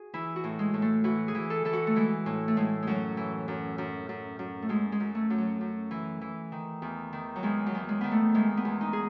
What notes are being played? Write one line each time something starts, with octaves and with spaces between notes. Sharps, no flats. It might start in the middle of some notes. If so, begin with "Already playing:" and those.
Already playing: F#4 G#4
E3 E4
F#4
A2
G#3
A2
A3
E3 F#4
G#4
E3
A4
E3 A4
F#4
A3
E3 G#3
A2
A3
A2 G#3
F#2 F#3 G#3
E3
F#2
F#2
F#2
F#2
A3
F#2 G#3
G#3
F#2
A3
F#2
F#3
F#2
E3
E3
D#3
E2
D#3
F#3
E2 G#3
F#3
E2
G#3
D#3 B3
A3
E2 G#3
B3
E2
D#4
G#4